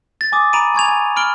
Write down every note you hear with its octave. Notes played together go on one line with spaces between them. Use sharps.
A6
G#5 D6 D#6
A#5 B5 D7 D#7
G#5 C#6 G#6 F7
G#5 F7
B5 F6 D7 G7